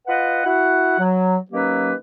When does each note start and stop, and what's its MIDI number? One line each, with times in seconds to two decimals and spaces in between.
0.07 0.43 65
0.07 0.43 71
0.07 0.43 75
0.07 0.43 78
0.45 0.96 64
0.45 0.96 66
0.45 0.96 78
1.00 1.36 54
1.51 1.93 51
1.51 1.93 54
1.51 1.93 58
1.51 1.93 61
1.51 1.93 67
1.51 1.93 71